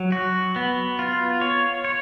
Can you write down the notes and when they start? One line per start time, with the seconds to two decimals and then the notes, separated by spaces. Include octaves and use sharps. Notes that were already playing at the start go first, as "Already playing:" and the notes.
Already playing: F#3
0.12 F#4
0.56 B3
0.99 F4
1.41 C#5
1.84 C#5